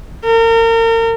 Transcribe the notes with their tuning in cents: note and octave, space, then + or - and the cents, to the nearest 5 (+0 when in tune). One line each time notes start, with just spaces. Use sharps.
A#4 -35